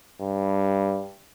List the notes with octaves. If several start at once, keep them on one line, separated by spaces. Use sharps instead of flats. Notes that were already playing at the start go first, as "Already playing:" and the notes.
G2